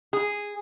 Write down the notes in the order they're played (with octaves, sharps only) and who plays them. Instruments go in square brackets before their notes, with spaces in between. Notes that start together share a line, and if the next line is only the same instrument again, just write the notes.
[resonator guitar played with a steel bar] G#4